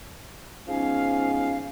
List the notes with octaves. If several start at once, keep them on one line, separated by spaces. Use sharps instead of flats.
G#2 F3 B3 C#4 F5